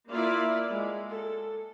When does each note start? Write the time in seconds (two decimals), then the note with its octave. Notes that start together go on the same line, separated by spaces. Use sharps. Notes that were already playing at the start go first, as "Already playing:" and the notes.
0.11 A#3 E4 F4 D5 E5 F5
0.69 G#3
1.10 A4